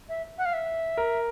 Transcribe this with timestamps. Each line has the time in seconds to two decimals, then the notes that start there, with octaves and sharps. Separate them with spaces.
0.09 E5
0.38 F#5
0.46 F5
0.53 E5
0.98 A#4